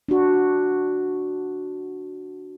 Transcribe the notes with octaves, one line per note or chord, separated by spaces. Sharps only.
D4 F#4